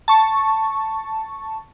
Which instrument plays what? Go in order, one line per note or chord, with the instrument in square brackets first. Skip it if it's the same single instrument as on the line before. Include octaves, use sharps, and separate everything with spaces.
[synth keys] A5 C#6